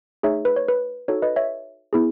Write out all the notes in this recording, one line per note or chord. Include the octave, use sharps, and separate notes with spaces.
A3 D#4 G#4 C#5 E5
B4
C#5
B4
D#4 F#4 A4 C#5
B4 D#5
C#5 E5
B3 E4 G#4